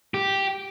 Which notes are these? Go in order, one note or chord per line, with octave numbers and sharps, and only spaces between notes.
G4